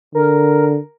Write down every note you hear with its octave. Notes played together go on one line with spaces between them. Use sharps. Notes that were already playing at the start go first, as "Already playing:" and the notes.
D3 A#4